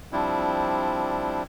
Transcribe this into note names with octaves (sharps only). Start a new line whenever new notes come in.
F3 G3 C4 D4 E4